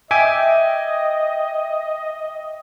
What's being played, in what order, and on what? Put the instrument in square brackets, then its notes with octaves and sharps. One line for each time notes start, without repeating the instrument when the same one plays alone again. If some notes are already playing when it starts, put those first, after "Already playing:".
[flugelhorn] D#5 [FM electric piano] E5 G5 D6 [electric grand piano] G#5